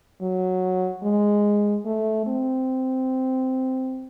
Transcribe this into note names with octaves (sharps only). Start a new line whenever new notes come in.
F#3
G#3
A3
C4